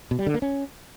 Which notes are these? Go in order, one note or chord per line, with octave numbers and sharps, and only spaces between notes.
B2
G3
D3
A#3
C#4